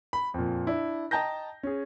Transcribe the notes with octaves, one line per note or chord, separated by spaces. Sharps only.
B5
F2 A#2
D4 E4
D#5 G5 A5 A#5 G6 A#6
C#4 G#4